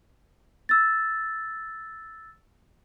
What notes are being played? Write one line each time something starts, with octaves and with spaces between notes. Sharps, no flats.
E6 A6